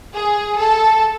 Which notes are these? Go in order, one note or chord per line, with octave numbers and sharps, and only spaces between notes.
G#4
A4